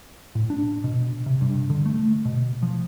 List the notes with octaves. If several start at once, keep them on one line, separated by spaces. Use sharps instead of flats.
A2
D4
B2
C3
G2
D3
A3
B2
F3